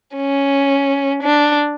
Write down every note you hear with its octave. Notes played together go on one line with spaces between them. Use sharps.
C#4
D4